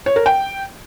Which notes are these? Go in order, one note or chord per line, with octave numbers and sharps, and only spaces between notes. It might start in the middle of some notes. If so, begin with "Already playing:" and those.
C#5
A#4
G5